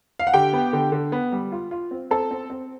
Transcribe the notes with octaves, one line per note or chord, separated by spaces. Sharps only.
F5
F#5
D3 G4 G5
B3
D3
D3
B3
G3
F4
F4
C4
C4 A4 A5
C4
C4